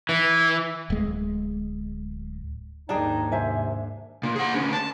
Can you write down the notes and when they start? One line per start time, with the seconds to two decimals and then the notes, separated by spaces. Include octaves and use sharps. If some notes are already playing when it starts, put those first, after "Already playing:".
0.09 E3
0.90 D1 G#3
2.89 D#2 G#2 D4 D#4 G#4 G5 A5
3.32 C3 C5 E5 G#5
4.23 A#2
4.36 G#4 F#5
4.55 D2 C#4
4.73 A5